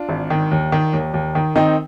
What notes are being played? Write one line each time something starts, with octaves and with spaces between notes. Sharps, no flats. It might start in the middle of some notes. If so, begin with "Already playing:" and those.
Already playing: D4 F4
G#1
D#3
D#2
D#3
D#2
D#2
D#3
D#3 C4 D#4